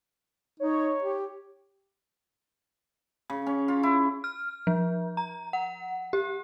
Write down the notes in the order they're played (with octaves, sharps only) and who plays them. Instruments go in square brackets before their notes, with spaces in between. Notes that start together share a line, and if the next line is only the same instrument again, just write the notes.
[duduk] D#4 [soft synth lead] C#5
[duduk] G4
[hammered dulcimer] C#3
C#4
F4
E4
[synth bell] F6
F3
A#5
F#5
G4